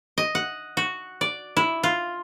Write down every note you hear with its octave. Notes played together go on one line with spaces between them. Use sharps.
D#5
F#5
F#4
D5
E4
F4